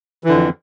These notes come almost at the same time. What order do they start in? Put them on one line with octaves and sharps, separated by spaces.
E3 D3 F2